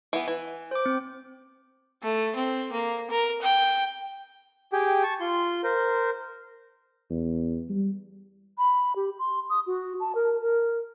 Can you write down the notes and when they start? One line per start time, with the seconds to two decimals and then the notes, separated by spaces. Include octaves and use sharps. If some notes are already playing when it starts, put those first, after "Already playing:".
0.13 E3 B3
0.28 E3
0.71 C5 D6
0.86 C4
2.03 A3
2.36 C4
2.73 A#3
3.11 A#4
3.41 G5
4.73 G4 G#4 G5
5.03 A5 C#6
5.20 F4 C6
5.64 A#4 C5
7.10 E2
7.69 G3
8.58 B5
8.96 G4
9.19 C6
9.50 D#6
9.67 F#4
10.00 A5
10.15 A#4
10.41 A#4